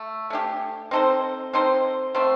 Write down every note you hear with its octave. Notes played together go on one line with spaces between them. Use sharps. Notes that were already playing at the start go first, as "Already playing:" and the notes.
Already playing: A3
A3 D4 G4
C4 D#4 A4 C5
C4 D#4 A4 C5
D3 A3 C4